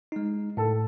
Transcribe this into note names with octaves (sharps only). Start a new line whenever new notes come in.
G#3 D#4
A2 A4